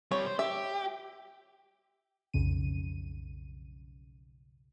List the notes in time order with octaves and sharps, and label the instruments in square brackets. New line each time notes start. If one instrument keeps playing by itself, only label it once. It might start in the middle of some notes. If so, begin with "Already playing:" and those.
[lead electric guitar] G3 C4 [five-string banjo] C#5
[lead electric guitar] C5
[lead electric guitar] G4 [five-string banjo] E5
[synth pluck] B1 F2 C#3 D#7